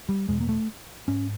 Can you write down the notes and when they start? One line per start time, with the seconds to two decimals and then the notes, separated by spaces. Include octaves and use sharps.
0.09 G3
0.28 E2 B2 G#3
0.41 A#3
0.49 A3
1.08 G#2 C#4